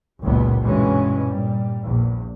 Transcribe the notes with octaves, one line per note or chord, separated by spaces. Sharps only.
F#1 C#2 A#2 B3
G2 B2 E3 G#3 C#4
A#2 G3
A#1 E2